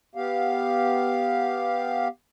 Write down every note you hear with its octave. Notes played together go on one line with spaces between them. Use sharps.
B3 G4 F5